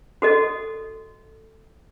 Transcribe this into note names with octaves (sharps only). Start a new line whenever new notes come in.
F#4 A4 D#5